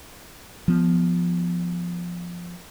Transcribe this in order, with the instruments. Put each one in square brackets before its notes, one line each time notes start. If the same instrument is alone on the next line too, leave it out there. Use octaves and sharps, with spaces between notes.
[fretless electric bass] F3 B3